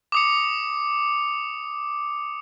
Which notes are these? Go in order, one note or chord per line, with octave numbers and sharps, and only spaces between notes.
D6 D#6 C#7